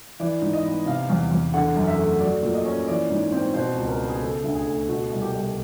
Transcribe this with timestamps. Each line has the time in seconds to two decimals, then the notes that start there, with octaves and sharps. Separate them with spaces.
0.20 E3 D5
0.42 G#2
0.53 D#5
0.65 B3
0.86 C3 F5
1.10 E2
1.31 E2
1.54 D3 F#5
1.76 F#2
1.87 E5
1.98 A3
2.20 F#3 D5
2.43 A#2
2.54 D#5
2.65 C#4
2.88 E3 D5
3.10 G#2
3.32 C4
3.54 B2 C5
3.76 C#2
3.88 A#4
3.99 B3
4.09 G#4
4.21 C#3 A4
4.44 D2
4.55 G#4
4.67 A3
4.88 B2 F#4
5.11 C2
5.22 G4
5.33 C2